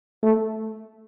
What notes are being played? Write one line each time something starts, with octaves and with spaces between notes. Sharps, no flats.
A3